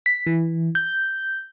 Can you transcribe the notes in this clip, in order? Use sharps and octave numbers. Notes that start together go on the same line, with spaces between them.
B6
E3
G6